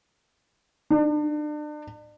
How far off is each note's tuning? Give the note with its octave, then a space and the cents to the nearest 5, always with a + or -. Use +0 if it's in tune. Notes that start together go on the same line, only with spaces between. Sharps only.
D4 +35